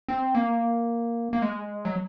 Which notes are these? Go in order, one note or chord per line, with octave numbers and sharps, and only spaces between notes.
C4
A#3
A#3
G#3
F#3